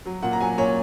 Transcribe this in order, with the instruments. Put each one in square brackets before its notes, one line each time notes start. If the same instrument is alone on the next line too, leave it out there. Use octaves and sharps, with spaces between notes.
[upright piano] F#3
A#2 F#5
A#5
F#3 G#5
A#2 C#5